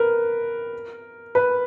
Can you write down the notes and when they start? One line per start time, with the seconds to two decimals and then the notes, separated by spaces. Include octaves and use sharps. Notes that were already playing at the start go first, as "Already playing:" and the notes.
Already playing: A#4 B4
1.35 B4